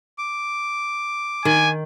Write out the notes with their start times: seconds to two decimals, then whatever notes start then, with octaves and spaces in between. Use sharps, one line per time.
0.18 D6
1.45 D#3 G#5